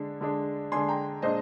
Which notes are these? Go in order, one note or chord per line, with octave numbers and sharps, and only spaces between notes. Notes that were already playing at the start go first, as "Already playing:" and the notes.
Already playing: D3 G#3 D4
D3 G#3 D4
D3 G#3 D4 G#5 C6
G5 A#5
A#2 G#3 D4 C5 D#5